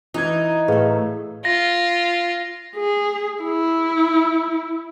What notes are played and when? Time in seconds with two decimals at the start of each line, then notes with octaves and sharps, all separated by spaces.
0.14 E3 D#4 G#6
0.68 A2 A3 G#4 B4 F5
1.45 F4 A#6
2.76 G#4
3.43 E4